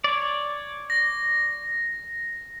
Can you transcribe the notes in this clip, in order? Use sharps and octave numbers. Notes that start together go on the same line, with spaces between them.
C#5 D5
A#6